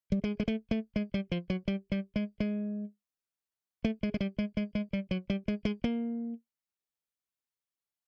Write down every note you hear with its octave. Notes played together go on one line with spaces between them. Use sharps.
G3
G#3
G#3
A3
A3
G#3
G3
F3
F#3
G3
G3
G#3
G#3
A3
G#3
G#3
G3
G#3
G#3
G#3
G3
F#3
G3
G#3
G#3
A#3